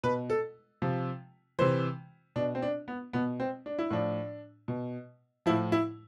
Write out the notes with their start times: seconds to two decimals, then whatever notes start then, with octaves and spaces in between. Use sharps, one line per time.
0.03 B2 B4
0.30 A4
0.82 C3 F3
1.59 C3 E3 C5
2.36 B2 D4
2.55 C4
2.62 D4
2.88 B3
3.13 B2 B3
3.40 C4
3.66 D4
3.79 E4
3.91 A2 F3 D4
4.68 B2
5.46 F3 E4
5.49 A2
5.72 E4